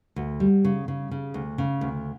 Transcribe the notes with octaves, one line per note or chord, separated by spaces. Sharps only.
D2
G3
C#3
C#3
C#3
D2
C#3
D2